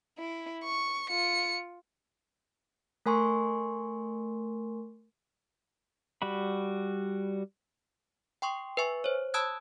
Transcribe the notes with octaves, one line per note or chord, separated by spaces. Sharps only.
E4
C#6
F4 C#7
A3 A#4 G#5 C6 C#6
G3 F#4 B5
G5 C6 C#6 D#6
B4 E5 G#5 C#6
C5 C#5
A5 B5 D#6 E6 F#6 G#6